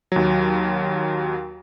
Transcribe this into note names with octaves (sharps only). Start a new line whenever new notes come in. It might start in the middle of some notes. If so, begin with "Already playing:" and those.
D#2 F#3